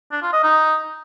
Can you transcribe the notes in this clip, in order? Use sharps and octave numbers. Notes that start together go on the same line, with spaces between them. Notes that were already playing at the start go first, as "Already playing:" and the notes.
D4
F4
D#5
D#4